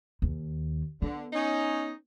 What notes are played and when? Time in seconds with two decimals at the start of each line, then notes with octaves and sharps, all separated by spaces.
0.22 D#2
1.02 D3 B3
1.33 C#4 D#4